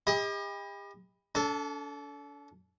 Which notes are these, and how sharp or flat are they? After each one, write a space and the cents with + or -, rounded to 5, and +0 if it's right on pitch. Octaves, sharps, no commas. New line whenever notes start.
G4 +45 D#5 +30 B5 +0
D4 -40 A4 +0